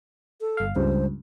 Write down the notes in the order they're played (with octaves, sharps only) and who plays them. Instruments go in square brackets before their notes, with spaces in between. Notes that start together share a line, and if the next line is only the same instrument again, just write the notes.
[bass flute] A4
[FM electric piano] G1 F5
[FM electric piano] C#2 G2 [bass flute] C5